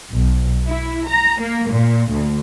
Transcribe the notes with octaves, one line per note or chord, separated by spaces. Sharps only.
B1
E4
A#5
A#3
A#2
D2